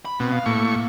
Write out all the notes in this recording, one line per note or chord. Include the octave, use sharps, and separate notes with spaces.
B5
B2 C4
F5
A2 A#3 C#6